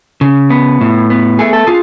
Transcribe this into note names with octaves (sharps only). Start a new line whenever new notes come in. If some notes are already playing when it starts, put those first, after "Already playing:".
C#3
B3
A2
B3
A3 G#4
A4
F4 G#4